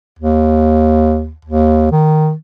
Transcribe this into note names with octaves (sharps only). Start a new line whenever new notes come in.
D#2
D#2
D#3